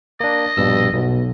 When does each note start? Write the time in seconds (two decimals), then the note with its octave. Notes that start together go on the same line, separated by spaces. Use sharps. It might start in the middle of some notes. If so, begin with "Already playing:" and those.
0.20 A#3 D4 D#5
0.57 A#1 G2 B2 E6
0.93 B1 B2